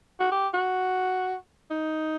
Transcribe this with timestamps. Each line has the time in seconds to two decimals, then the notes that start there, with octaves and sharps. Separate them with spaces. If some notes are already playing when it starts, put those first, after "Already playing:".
0.20 F#4
0.32 G4
0.54 F#4
1.70 D#4